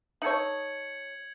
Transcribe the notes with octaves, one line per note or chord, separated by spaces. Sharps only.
D#4 A4 C#5 G#6 C#7 F#7